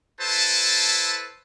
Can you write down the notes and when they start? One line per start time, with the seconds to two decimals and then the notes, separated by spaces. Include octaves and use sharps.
0.21 E4 A4 B4 C5 A5